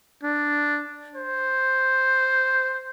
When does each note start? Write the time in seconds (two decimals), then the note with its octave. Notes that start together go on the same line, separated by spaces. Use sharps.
0.23 D4
1.15 C5